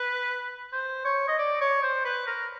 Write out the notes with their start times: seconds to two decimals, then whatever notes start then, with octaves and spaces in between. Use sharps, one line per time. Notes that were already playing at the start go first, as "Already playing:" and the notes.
Already playing: B4
0.73 C5
1.05 C#5
1.28 D#5
1.39 D5
1.61 C#5
1.83 C5
2.05 B4
2.27 A#4